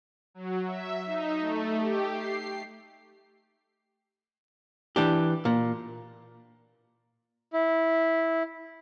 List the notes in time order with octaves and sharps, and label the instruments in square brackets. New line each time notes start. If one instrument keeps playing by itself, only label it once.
[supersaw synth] F#3
E5
D#4
A3
G4
C7
[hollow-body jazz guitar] E3 D4 G4
A#2
[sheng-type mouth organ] E4